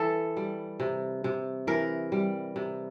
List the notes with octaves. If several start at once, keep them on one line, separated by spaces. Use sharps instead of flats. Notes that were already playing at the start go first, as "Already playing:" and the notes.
Already playing: E3 A4
G3
C3
C3
E3 A#4
G3
C3